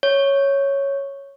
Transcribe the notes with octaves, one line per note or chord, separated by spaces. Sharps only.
C#5